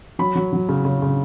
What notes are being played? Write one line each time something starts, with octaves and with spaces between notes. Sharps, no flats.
F#3 B5
F#3
F#3
C#3
C#3
C#3